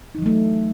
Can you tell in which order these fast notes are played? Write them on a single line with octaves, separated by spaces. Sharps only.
D#4 E3 F#3 A3